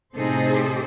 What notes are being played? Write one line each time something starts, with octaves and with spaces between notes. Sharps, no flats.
A2 C3 D#4 G#4 A4 C5